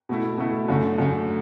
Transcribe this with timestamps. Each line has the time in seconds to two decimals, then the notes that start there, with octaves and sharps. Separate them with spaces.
0.09 B2 A3 E4
0.38 B2 A3 E4
0.69 F#2 D3 A3
0.98 F#2 D3 A3